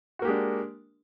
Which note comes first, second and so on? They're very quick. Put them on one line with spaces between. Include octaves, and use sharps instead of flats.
F#4 A#3 G4 G#3 D4